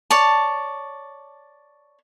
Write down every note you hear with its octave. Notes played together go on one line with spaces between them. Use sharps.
C#5 D5 A5